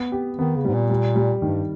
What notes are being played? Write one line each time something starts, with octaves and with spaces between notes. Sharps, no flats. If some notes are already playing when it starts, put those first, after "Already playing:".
Already playing: B3
G4
D#3 B3
C#3
G#2 G3
A#2
G3
G3
G2 D#3